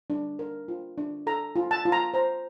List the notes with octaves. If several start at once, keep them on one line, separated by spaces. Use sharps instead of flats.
D4
A#4
F4
D4
A4 A#5
F4
A5
F4
A#5
C5 A#5